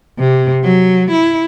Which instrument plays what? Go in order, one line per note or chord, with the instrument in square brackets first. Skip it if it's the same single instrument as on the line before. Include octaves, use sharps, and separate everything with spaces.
[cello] C3
F#3
E4